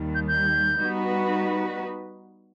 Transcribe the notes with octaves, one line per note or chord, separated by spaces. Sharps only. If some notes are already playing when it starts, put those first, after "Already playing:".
Already playing: D#2 D#3 G3
G6
G6
G3 B3 D#4 F#4 B4